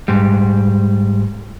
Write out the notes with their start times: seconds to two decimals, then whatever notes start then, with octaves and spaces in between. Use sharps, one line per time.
0.08 G#2 G3